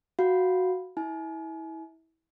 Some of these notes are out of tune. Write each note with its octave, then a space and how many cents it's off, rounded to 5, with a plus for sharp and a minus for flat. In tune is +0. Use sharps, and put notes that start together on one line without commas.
F#4 +0 F5 +0 B5 +0
E4 -25 G#5 +35